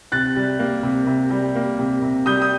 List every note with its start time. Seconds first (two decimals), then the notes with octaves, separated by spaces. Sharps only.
0.12 C3 F#6 A6
0.36 G3
0.59 A#3
0.83 C3
1.07 C3
1.30 G3
1.56 A#3
1.79 C3
2.02 C3
2.26 G3 D#6 G6
2.42 D#6